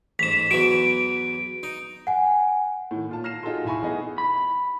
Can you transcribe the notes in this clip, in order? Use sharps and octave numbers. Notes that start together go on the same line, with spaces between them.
A1 G#2 B6 E7
E2 E3 F#3 D7
D#4
F#5 G#5
A2 D#3
A#2 F4 A5
F6 A#6 C7 E7
D#4 F4 F#4 G#4 A4 C6
B1 E2 E4 G#5 B5 C#6
E3 A3 B3 D#4 G#4 D#5
B5